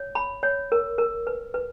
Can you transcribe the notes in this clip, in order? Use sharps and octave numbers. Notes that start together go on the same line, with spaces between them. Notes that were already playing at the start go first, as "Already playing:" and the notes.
Already playing: C#5
B5
C#5
A#4
A#4
B4
B4